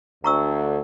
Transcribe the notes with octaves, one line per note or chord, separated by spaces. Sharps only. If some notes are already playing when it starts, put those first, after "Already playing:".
D2 A#5 C#6 E6